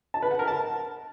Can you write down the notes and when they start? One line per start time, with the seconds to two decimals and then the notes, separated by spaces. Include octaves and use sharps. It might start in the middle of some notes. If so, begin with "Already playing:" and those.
0.14 A5
0.22 B4
0.31 F#5
0.39 A#4
0.48 A5